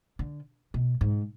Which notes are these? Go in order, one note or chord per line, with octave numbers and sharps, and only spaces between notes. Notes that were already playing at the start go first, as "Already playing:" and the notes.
D3
B2
G#2